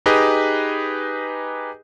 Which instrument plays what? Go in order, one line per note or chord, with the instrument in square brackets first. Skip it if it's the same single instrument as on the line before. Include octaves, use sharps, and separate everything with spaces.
[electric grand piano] D#4 G4 G#4 B4 D#5